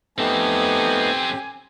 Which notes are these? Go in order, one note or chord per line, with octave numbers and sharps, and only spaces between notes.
A3 B3 C4 D#4 G4 A4 G#5